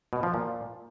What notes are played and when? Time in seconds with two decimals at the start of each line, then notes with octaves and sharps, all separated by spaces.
0.13 B2
0.23 F3
0.34 A#2